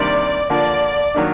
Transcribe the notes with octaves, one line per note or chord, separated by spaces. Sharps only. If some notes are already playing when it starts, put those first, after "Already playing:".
Already playing: C3 D#3 G3 A#3 D4 D5
D3 F3 A#3 D5
D#3 F#3 A#3 D4